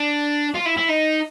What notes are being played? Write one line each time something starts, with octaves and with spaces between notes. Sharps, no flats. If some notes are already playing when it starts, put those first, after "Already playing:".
Already playing: D4
F4
E4
E4
D#4